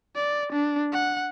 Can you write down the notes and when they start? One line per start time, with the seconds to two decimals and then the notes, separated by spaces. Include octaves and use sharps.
0.15 D5
0.52 D4
0.92 F#5